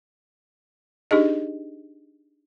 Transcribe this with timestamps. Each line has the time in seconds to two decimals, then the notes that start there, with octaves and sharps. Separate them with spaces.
1.11 D4 D#4 G4 G#4 D#5